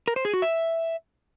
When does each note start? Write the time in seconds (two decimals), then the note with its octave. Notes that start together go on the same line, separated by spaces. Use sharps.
0.08 A#4
0.16 C5
0.25 G#4
0.34 F#4
0.42 E5